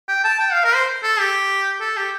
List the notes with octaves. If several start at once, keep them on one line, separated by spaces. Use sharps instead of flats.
G5
A5
G5
F5
A#4
C5
A4
G4
A4
G4